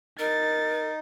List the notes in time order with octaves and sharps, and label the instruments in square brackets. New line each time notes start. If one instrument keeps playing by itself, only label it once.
[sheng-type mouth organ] D#4 [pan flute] A#4 [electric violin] A6